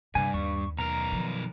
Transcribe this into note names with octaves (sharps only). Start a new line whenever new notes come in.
G2 C3 G#5
D#2 C#6
B1 A#4 A#5
D#3 F3